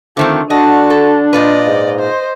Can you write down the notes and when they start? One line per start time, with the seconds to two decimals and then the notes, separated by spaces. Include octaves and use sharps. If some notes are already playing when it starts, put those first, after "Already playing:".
0.17 D3 D#3 F3 A3 C4
0.50 D3 D4 F#4 D#5 A5
0.90 A4
1.33 A#2 F4 B4 D5 D#5
1.66 G#2
1.99 C5 D#5